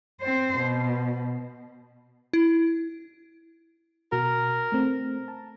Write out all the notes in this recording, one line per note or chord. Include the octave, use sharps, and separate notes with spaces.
C4 C5
B2
E4
B2 F#4 A#4
A3 C4
A5